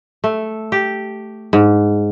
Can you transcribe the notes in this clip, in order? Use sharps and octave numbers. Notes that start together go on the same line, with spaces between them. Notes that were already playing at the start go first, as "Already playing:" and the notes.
A3
G4
G#2